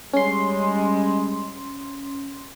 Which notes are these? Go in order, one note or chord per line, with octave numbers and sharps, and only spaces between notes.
G3 G#3 C#4 C6